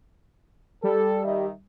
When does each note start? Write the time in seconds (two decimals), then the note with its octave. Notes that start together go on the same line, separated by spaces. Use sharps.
0.84 G3 A4
1.25 D#3 D#5 E5